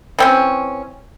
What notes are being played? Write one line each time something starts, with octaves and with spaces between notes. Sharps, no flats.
E3 C4 C#4